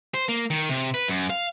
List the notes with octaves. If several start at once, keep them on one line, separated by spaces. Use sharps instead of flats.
C5
A#3
D#3
C3
B4
F#2
F5